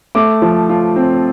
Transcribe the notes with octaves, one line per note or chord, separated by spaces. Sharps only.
A3 D6
F3
F4
C4